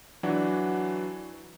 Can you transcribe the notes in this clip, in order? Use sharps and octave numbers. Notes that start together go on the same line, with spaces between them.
E3 F#3 D4 F#4